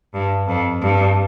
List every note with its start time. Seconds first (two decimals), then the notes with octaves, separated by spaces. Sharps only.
0.14 G2
0.48 F2
0.82 G2